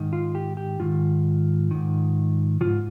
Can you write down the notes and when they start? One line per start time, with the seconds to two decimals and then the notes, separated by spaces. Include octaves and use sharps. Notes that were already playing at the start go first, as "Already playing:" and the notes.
Already playing: G#2 D#3
0.13 F4
0.35 G4
0.57 G4
0.80 G#2 D#3 F4
1.71 G#2 D#3
2.61 G#2 D#3 F4